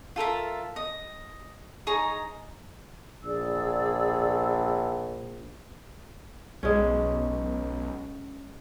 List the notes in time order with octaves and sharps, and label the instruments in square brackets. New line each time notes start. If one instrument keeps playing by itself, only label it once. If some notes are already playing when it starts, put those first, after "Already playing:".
[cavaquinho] F4 A4 A#4 E5
D#5
D#4 G#4 C#5 A#5
[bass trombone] A#1 [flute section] G#4 D5 E6
[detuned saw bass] B1 [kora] G#3 C#4